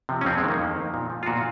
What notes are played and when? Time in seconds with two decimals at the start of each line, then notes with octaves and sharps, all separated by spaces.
0.09 C3 F3
0.21 C#4
0.25 F2 C4
0.38 G#3
0.43 D#3
0.48 A#3
0.59 F2
0.76 D#3
0.94 A#2
1.10 F3
1.23 F4
1.26 A#2 F#4